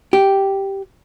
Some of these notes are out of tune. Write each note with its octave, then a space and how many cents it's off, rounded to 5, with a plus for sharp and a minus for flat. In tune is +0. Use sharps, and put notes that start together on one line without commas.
G4 -5